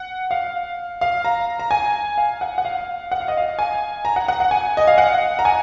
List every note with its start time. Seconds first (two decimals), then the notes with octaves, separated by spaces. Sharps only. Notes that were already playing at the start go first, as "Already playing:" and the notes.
Already playing: F#5
0.31 F5
1.01 F5
1.25 A#5
1.59 A#5
1.71 G#5
2.18 F5
2.41 F#5
2.58 F#5
2.65 F5
3.12 F#5
3.20 F5
3.28 D#5
3.37 F5
3.59 G#5
4.05 A#5
4.16 F#5
4.28 F#5
4.40 F#5
4.51 G#5
4.77 D#5
4.87 F5
4.98 F#5
5.39 A#5
5.45 G#5